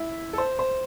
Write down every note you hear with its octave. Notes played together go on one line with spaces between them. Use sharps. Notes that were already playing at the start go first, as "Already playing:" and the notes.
Already playing: E4 E5
A4
C5
C5